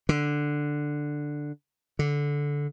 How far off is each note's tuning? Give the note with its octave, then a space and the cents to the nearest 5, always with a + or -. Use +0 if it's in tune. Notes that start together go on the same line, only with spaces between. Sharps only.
D3 +5
D3 -15